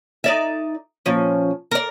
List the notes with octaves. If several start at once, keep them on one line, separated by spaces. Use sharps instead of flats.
D#4 D5 E5
A#2 F3 C#4
A#4 D5